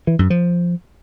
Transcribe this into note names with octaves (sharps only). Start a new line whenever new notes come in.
E3
F#2
F3